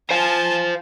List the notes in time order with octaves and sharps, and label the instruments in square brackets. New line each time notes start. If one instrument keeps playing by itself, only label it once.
[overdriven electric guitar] C5 F5 [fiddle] G#5 A5